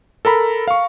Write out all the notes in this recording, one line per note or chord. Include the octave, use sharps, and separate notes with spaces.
A4 A#4 A#5 B5
F5 C#6